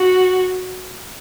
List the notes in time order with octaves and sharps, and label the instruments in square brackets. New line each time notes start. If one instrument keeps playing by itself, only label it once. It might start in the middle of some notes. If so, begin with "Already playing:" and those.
Already playing: [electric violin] F#4